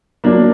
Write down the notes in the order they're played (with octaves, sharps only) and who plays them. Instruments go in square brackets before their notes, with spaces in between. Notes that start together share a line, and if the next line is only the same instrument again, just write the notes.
[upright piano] F#3 [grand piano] A#3 D4